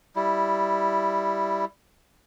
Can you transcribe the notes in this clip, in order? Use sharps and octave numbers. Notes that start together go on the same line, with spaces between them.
G3 E4